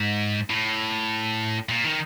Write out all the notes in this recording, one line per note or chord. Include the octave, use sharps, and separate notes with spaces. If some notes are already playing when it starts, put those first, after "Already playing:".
Already playing: G#2
A2
A#2
D#3